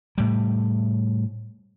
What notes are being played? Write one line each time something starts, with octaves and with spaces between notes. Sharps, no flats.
A2 G3